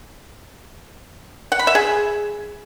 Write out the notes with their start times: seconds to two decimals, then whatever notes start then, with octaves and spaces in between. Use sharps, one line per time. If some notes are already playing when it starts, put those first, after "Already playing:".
1.52 F#5
1.59 B5
1.67 E5
1.75 G#4